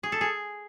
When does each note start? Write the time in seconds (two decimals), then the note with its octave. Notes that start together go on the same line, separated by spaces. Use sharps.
0.03 G#4
0.12 A4
0.21 G#4